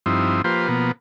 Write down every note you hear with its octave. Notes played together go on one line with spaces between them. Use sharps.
G2 F3 C4 D#4 E4
F3 A#3 F4 G4 B4 C5
B2 F3 A#3 B3